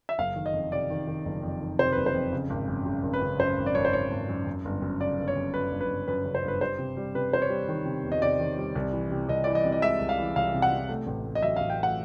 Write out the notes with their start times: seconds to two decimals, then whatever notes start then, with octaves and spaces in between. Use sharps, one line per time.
0.09 E5
0.18 F#1 F5
0.36 D#3
0.46 D#5
0.53 F2
0.72 C3 D5
0.90 D#3
1.07 D#3
1.25 F#1
1.43 F2
1.61 D#3
1.79 C3 C5
1.92 F#1 B4
2.06 C5
2.14 F2
2.33 C#3
2.50 G#1
2.68 F#2
2.86 C#3
3.03 G#1
3.13 B4
3.22 C#3
3.39 F#2 C5
3.58 G#1
3.66 D5
3.75 G#1 C#5
3.85 C5
3.93 G#1 C#5
4.11 G#1
4.29 F#2
4.47 F#2
4.65 G1
4.82 F#2
5.00 C#3 D5
5.19 G1
5.28 C#5
5.36 F#2
5.54 F#2 B4
5.71 G1
5.81 B4
5.89 G1
6.08 F#2 B4
6.25 C#3
6.35 C5
6.43 G1
6.48 B4
6.60 G3 C5
6.78 C3
6.97 G3
7.15 C3 B4
7.32 G3 C5
7.42 C#5
7.50 G3
7.68 D#3
7.86 C3
8.04 E2
8.12 D#5
8.22 C3 D5
8.39 D#3
8.58 G3
8.75 C2
8.92 E3
9.11 C3
9.28 C2 D#5
9.44 E3 D5
9.55 D#5
9.65 C3
9.72 D#5
9.82 G#3 E5
10.00 C2
10.09 F5
10.19 E3
10.36 C2 F5
10.54 C3
10.62 F#5
10.72 C3
10.89 A3
11.07 A1
11.26 A3
11.35 D#5
11.42 F#3 E5
11.56 F5
11.61 A1
11.70 G5
11.79 A3 F#5